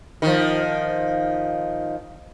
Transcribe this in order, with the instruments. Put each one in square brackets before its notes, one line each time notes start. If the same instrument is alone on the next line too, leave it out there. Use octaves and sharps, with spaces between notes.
[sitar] D#3 F3